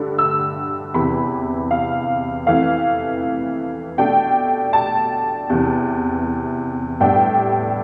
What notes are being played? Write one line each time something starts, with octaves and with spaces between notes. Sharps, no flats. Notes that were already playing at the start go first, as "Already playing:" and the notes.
Already playing: G2 D3 A3
E6
E2 C3 E3 B5
F5
F2 E3 A3 F5
B2 A3 D4 G5
A5
E2 C3 E3
A2 G3 B3 D4 G5